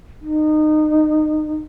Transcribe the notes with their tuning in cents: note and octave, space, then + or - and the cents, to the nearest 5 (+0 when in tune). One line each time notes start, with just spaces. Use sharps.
D#4 -25